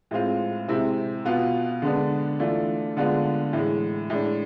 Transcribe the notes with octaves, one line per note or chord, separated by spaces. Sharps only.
A2 G#3 C4 F4
C3 G#3 C4 E4
B2 B3 F4
D3 G#3 B3 D4
E3 A3 D4 F4
D3 G#3 B3 D4 F4
A2 E3 G#3
A2 G#3 D4